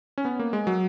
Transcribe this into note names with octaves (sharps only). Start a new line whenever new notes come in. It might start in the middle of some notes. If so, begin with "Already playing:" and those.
C#4
B3
A#3
G#3
F#3